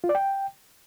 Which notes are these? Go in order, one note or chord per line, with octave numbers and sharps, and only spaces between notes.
F4
D5
G5